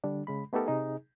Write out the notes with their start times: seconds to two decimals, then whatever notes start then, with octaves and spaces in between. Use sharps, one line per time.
0.04 D3 G3 D4
0.27 C#3 G#3 B5
0.53 A3 B3 D#4 G4 A4 A#4
0.67 C3 D#4 G#4